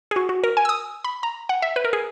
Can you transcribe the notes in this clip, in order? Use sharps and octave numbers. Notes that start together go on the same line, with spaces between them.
G#4
F#4
F#4
A#4
G#5
E6
D#6
B5
A#5
F#5
E5
B4
A#4
G#4